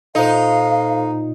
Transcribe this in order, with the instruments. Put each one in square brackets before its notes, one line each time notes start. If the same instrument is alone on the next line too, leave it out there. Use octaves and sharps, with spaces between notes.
[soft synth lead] A#2 [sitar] D#4 [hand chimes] A4 C5 [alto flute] F5